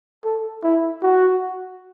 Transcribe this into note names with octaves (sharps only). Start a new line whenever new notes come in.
A4
E4
F#4